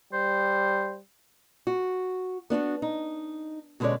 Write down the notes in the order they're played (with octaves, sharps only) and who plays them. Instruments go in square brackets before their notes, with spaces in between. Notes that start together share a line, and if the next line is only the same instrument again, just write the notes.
[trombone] G3 [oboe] C5
[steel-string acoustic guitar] F#4
B3 D4 F4 F#4
D#4
B2 D3 G#3 C#4 C#5 D5